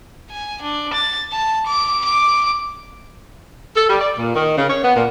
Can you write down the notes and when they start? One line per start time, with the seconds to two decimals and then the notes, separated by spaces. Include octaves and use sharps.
0.31 G#5
0.62 D4
0.93 A6
1.32 A5
1.67 D6
2.05 D6
3.76 A4
3.89 G3
4.01 D5
4.19 A#2
4.35 D#3
4.58 C#3
4.70 C#5
4.83 B3
4.96 A#2